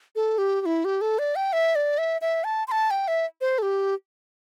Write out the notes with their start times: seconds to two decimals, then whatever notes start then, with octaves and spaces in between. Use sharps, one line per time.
0.16 A4
0.38 G4
0.61 G4
0.66 E4
0.85 G4
1.01 A4
1.19 D5
1.36 G5
1.53 E5
1.75 D5
1.98 E5
2.21 E5
2.44 A5
2.68 C6
2.72 A5
2.91 G5
3.08 E5
3.41 C5
3.58 A4
3.62 G4